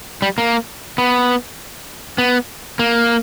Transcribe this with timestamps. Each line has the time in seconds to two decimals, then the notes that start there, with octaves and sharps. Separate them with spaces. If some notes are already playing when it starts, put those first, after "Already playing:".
0.22 G3
0.38 A#3
0.98 B3
2.18 B3
2.79 A#3